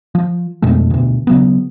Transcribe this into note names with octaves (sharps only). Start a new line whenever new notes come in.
F3
F2 B2 G#3 A3
D2 B2
C#3 F#3 B3